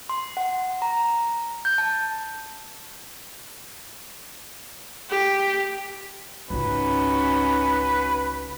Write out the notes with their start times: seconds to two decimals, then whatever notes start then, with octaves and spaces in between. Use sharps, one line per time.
0.09 C6
0.37 F#5
0.82 A#5
1.65 G6
1.78 A5
5.10 G4
6.50 G#1 C#2 C#4 D#4 F#4 B4